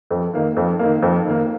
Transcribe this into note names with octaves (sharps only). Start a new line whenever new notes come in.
F2
D#3 A#3
F2
D#3 A#3
F2
D#3 A#3